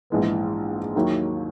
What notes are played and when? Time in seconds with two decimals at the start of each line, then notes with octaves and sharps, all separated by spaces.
0.10 A#1 G#2 E3 G#3 B3
0.95 D#2 D#3 F#3 A#3 E4